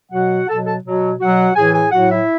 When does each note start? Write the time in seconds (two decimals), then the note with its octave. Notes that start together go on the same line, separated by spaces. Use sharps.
0.12 B2 F#3 F#4 F#5
0.48 B2 F#3 A4 A5
0.66 A4 A5
0.83 B2 F#3
1.19 B2 F#3 F#4 F#5
1.55 A2 E3 G#4 G#5
1.73 G#4 G#5
1.91 A2 F#3 F#4 F#5
2.09 E4 E5